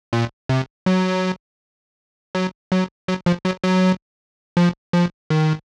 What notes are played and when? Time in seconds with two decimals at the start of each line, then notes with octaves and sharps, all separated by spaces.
0.13 A#2
0.49 C3
0.86 F#3
2.35 F#3
2.72 F#3
3.08 F#3
3.26 F3
3.45 F#3
3.64 F#3
4.57 F3
4.93 F3
5.30 D#3